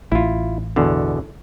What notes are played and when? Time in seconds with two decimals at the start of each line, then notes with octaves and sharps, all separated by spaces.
0.12 A1 E4 F4
0.76 E2 B2 D3